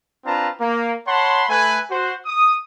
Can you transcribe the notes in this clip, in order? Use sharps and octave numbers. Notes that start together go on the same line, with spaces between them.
C4 D4 F4 B4 A5 A#5
A#3
C#5 F#5 A5 B5 C6
A3 B4 G#5
F#4 C5
D#6